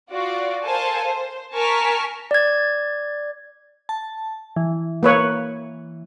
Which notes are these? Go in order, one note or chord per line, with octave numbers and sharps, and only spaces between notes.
F4 F#4 D5
A4 A#4 C5 F5 G#5 A5
C5
A#4 G#5 A5 C#6 F6 B6
D5 G#6
A5
E3
A#3 B4 C#5